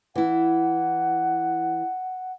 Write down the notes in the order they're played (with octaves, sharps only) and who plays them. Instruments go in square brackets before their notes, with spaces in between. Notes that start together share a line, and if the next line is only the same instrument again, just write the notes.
[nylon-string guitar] E3 E4 [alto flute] F#5